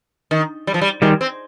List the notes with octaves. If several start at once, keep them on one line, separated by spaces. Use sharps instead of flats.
D#3
G3
F3
G3
D#3 G3 G#3
C4